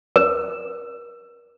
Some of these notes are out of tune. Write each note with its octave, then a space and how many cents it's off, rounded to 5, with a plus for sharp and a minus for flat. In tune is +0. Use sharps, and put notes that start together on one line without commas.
A#4 +35